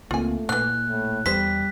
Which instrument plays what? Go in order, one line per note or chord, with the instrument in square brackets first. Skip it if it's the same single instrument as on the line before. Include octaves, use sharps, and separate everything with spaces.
[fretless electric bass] C#2 A#3 C4 [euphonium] A3 [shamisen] F4 G#5
[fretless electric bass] A#2 [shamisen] D3 E3 [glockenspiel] F#6
[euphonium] A2
[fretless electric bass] E2 [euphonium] G3 [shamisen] B3 A4 C5 [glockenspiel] B6